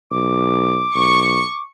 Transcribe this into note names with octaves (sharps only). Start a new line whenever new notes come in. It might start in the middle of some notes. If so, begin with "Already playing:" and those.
B1 D6
B1 C#6